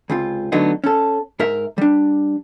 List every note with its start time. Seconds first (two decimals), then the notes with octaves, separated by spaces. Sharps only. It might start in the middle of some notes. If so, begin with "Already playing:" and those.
0.10 C#2 C3 F4
0.52 D3 F#3 A3 B3 D4 D#4
0.84 C#4 A4
1.39 G#2 A#4 E5
1.78 G3 D4